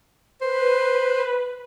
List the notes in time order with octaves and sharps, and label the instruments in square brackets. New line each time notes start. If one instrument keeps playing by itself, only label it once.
[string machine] B4 [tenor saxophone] C5